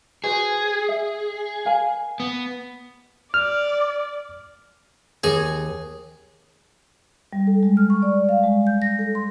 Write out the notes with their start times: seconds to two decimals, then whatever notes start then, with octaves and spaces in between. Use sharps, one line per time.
0.24 F#4 G#4 B4 C5
0.89 E5
1.65 A#4 F5 G#5
2.20 B3
3.34 D5 F6
5.24 D#2 G#4
7.33 G3
7.47 A4
7.63 G#3
7.77 F6
7.90 C#6
8.02 D5
8.29 F5
8.43 G#3
8.67 G6
8.82 A#6
8.99 A4
9.15 C6